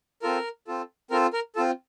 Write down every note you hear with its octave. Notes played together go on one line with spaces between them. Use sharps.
C4 F4 A4 A#4
C4 F4 A4
C4 F4 A4 A#4
A#4
C4 F4 A4